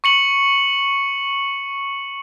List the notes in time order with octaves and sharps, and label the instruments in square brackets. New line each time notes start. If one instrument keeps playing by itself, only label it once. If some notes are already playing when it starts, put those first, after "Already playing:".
[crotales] C#6 C#7 F#7